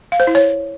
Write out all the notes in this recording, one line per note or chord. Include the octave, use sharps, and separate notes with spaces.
F5
C5
E4
C#5